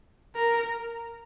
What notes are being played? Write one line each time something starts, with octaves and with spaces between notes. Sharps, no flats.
A#4